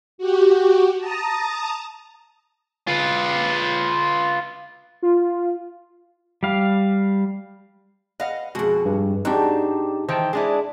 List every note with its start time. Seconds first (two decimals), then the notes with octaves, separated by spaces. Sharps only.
0.18 F#4 G4
0.98 A5 A#5 D#6
2.87 F4 B4
5.02 F4
6.43 G3 F5
8.20 B4 D#5 F5 F#5
8.55 F2 B2 G#3 F#4
8.85 G2
9.25 G#2 C4 D4 D#4 F#4 G4 F#5
10.08 D#3 E3 C5 G5 A5
10.33 G#3 D4 E4 G#4 D5